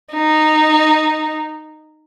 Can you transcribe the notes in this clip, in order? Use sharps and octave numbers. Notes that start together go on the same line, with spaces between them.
D#4